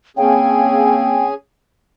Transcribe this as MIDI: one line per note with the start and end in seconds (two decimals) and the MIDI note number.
0.17 1.28 49
0.17 1.28 58
0.17 1.28 60
0.17 1.34 61
0.17 1.34 68
0.17 1.26 79